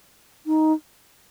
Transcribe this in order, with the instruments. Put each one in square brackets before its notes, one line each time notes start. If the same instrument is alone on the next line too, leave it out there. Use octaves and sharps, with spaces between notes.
[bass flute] D#4